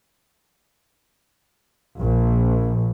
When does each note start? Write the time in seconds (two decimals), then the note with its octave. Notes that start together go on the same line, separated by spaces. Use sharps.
1.99 A#1